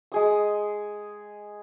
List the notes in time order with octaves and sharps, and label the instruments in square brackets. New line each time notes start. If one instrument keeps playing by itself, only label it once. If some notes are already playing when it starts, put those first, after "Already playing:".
[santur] G#3 G#4 D#6